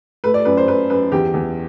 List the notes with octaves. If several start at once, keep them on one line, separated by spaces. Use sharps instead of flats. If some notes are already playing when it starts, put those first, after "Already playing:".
A3 B4
D5
F#2 B4
C5
F#2 B4
F#2 B4
E2 G4
E2